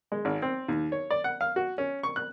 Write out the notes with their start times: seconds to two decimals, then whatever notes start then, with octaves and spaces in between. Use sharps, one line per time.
0.12 G#3
0.25 G#1
0.42 C4
0.68 D#2
0.92 C#5
1.11 D5
1.24 F#5
1.41 F5
1.56 F#4
1.78 C#4
2.03 C#6
2.16 F#6